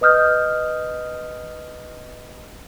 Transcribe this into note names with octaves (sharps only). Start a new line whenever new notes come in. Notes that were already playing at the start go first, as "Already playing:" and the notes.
B4 D#5 D#6 F6 G6